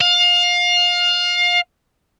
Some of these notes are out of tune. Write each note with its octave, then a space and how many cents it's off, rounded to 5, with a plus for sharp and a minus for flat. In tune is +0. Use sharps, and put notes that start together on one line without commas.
F5 +25